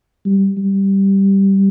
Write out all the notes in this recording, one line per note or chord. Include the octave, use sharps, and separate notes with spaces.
G3
G3